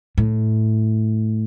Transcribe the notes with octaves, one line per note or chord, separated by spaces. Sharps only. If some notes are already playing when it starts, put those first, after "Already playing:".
A2